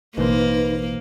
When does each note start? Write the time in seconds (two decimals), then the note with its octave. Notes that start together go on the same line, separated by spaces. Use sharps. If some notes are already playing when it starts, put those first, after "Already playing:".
0.17 A1 B2 E3 A#3 D#4 B4 C5